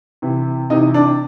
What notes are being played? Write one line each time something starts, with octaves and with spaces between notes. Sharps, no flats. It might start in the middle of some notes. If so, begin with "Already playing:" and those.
C3 E3
C3 E3 D#4
D4